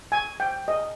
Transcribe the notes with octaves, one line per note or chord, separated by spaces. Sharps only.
G#5
G5
D#5